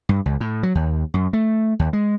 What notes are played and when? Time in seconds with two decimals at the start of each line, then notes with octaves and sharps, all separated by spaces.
0.09 G2
0.26 C#2
0.40 A2
0.63 F#3
0.75 D#2
1.14 F#2
1.33 A3
1.79 D#2
1.93 G#3